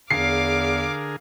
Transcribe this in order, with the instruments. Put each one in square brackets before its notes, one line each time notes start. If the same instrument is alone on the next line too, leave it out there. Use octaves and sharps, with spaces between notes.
[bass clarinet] E2 [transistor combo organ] D3 G#4 A#4 [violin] F5 D6 [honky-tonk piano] C7